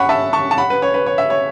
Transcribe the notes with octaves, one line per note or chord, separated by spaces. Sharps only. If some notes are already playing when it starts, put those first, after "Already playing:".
Already playing: F#5 B5 C#6
E5 A5
A5 C#6
A5
F#5 B5
B4
C#5
B4
C#5
E5
C#5